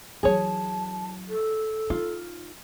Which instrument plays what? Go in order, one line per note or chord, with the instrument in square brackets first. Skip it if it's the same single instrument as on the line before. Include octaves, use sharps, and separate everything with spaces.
[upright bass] E3 F#3 [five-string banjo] G#4 C#5 [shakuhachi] A5
[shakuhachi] A4
[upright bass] D#4 [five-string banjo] F4